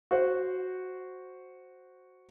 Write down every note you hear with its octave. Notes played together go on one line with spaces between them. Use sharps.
F#4 C5 F#5